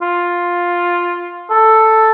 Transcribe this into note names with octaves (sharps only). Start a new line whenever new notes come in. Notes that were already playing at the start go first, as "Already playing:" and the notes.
F4
A4